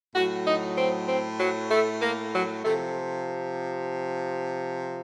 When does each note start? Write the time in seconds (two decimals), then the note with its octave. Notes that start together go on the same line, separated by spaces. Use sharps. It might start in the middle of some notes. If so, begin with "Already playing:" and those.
0.15 A2 F#3 F#4
0.47 D#4
0.78 C4
1.08 C4
1.40 F#3
1.71 A3
2.02 A#3
2.34 F#3
2.64 C3 F3 A3